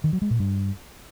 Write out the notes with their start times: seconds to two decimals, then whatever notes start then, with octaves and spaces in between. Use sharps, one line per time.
0.04 D#3
0.13 F#3
0.22 G#3
0.31 A#2
0.39 G2